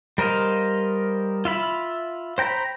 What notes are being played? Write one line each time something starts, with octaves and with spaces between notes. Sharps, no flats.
G3 A#4 C5 D#5 F5
F4 E5 B5
C5 G5 A#5 B5